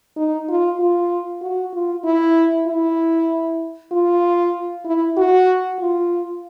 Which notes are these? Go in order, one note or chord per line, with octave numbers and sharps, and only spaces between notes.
D#4
F4
F4
F#4
F4
E4
E4
F4
E4
F#4
F4